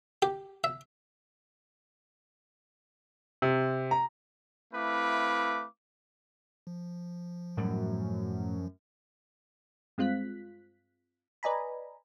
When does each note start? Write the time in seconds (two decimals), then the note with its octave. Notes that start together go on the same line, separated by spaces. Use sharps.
0.22 G4
0.64 E5
3.42 C3
3.91 A#5
4.73 A3 C4 E4 B4 F5 D6
6.67 F3
7.57 F#2 A2 G3
9.98 G2 G#3 C4 F4 F#6 B6
11.43 B4 D5 D#5 G#5 A#5 B5